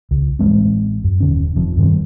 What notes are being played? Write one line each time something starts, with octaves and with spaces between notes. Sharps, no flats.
C#2
A1 F#3 G#3 C4
F#2
D#1 D3 C#4
F1 C3 F3
G2 D#3 G3 C4